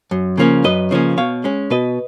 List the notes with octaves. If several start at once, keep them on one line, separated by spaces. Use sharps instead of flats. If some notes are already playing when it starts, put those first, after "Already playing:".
F#2
C#3 F3 A#3 C#4
F#2 B4 D#5
C#3 F3 A#3 C#4
B2 C#5 F5
G#3 C#4
B2 B4 D#5